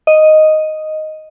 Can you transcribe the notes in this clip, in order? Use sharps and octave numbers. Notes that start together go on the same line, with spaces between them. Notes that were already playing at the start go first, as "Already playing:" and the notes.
D#5